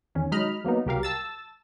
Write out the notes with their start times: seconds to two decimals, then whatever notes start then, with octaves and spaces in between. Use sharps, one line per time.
0.15 E2 D#3 C#4
0.32 F#3 G#3 D#4 D#5 B5 F6
0.65 F#3 A#3 B3 D#4
0.86 C2 F#3 G4 A#4 F5
1.03 A5 E6 A6